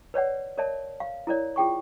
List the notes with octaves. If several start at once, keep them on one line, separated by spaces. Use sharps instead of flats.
B4 C#5 D5 F#5
A#4 C#5 D5 E5 A5
F5
E4 A#4 C#5 D5
F4 G#4 G5 C#6